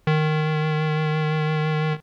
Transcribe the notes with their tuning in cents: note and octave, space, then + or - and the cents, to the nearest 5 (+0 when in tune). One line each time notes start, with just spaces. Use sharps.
D#3 -10